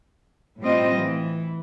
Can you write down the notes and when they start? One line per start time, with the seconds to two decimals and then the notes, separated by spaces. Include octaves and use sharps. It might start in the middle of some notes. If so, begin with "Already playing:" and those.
0.61 A2 G3 C4 F4 D#5
0.95 E3